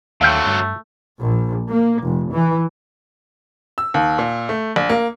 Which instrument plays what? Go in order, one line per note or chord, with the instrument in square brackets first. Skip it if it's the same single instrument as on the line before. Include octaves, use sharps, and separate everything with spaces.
[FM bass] D#2 [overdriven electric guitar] D3 F#3 [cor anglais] A3 [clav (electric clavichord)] E5 F5 G5
[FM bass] G2
[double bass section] A#1
A#3
F1
E3
[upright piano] E6
D#2
A#2
A3
A#1
A#3